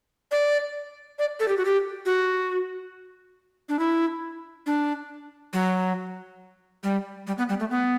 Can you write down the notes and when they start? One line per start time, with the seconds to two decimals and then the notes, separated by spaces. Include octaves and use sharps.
0.32 D5
1.19 D5
1.40 A4
1.48 G4
1.58 F#4
1.65 G4
2.06 F#4
3.69 D4
3.79 E4
4.66 D4
5.53 F#3
6.83 G3
7.27 G3
7.38 B3
7.49 G3
7.60 A3
7.70 B3